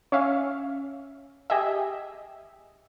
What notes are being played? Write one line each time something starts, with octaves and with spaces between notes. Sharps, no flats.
C#4 E5 F5
G4 G#4 D#5 E5